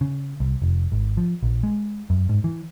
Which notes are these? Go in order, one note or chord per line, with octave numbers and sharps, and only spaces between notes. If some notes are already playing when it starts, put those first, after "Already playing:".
C#3
C2
F1
G#1
F3
A#1
G#3
F#2
G#2
E3